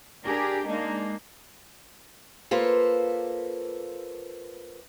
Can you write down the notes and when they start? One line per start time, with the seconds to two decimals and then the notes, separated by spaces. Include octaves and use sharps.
0.24 D4 G4 G#4 A#4
0.67 G#3 A#3 D4 D#4
2.51 A#3 F4 A4 B4 C5